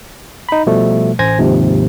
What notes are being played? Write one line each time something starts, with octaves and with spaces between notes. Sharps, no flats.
D#4 B5
B2 F3 G3 A3
A1 C5 G#5 G#6 A#6
D#2 G#2 C3 F3